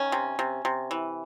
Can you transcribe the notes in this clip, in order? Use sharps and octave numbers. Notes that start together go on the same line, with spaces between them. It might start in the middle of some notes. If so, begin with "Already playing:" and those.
Already playing: D#3 C#4
C3
C3
C3
E3